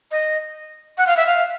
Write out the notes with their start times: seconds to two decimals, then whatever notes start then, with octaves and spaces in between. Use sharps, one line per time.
0.11 D#5
0.98 F#5
1.07 F5
1.17 E5
1.27 F5